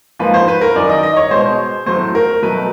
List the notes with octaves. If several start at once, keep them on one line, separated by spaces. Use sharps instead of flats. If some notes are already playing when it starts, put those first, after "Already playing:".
G#2 F3 A#3 B4
C5
B4
A#4
F#2 D#3 F#3 D5
D#5
D#5
C#5
B2 G#3 C5
A2 F#3 A3 C5
A#4
B2 F#3 A3 B4